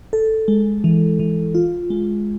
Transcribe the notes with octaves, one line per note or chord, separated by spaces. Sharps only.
A4
G#3
E3
E3
F4
G#3